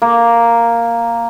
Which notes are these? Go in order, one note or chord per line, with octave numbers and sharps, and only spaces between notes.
A#3